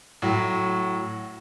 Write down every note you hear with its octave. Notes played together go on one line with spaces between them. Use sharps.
A2 F#3